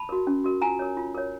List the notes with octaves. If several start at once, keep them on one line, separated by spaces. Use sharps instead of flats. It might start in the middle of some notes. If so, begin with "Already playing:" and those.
Already playing: A5 B5
F#4 A#4
C#4
F#4 A#4
F4 G#5 A#5
A#4 C#5
F4
A#4 C#5